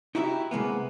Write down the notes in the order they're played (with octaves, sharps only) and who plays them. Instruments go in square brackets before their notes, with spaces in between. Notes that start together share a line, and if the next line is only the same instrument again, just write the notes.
[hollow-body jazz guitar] D#4 E4 F#4 G4 E5
C3 G#3 A#3 B3